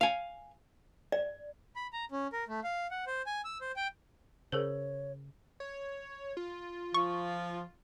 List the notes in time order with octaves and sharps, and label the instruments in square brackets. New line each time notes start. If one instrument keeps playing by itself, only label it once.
[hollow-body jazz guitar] F5 G#5
[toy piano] D5
[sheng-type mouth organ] B5
A#5
C#4
A#4
A3
F5
F#5
C5
G#5
E6
C5
G5
[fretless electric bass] C#3 [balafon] G#4 A#4 C5 [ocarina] C#5
[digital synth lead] C#5
F4
[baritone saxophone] F3 [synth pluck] C#6